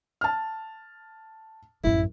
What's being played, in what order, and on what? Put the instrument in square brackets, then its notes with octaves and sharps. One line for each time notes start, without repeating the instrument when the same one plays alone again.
[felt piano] A5 F6
[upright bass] A1 F#2 [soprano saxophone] E4